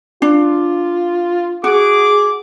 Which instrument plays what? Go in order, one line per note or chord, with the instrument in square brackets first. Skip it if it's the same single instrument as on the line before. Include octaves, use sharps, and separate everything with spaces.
[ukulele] D4 [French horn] F4
[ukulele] F#4 [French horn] G#4 [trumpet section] D6